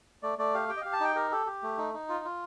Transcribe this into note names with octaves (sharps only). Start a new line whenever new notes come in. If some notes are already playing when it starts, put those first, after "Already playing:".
A3 D5
A3 D5
G4 F5
G4 G5
D#5
G4 F5
A5
D#4 G5
G4 A#4
G4 A4
G4
A3
D#4
D#4
F4
F4